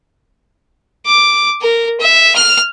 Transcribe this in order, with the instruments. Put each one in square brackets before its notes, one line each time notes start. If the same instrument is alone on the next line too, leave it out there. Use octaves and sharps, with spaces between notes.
[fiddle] D6
A#4
E5
F6